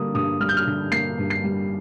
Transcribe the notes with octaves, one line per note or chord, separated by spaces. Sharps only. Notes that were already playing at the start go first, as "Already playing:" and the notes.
Already playing: D3 G3 A#3 D#6
G2 D#6
G3 F6
G6
F6
D3
A#3 C7
G2
C7
G3